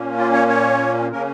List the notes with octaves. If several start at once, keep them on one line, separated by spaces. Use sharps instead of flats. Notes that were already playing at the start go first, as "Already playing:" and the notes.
Already playing: A#2 A#3 C#4
F4
C#5
C#5
C#3 A#3 C#4 A#4